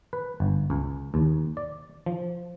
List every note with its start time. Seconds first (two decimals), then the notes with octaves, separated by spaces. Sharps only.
0.13 B4
0.40 G1
0.70 C#2
1.14 D#2
1.57 D5
2.06 F3